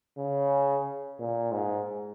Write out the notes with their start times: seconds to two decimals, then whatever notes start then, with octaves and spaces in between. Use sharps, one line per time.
0.17 C#3
1.19 A#2
1.52 G#2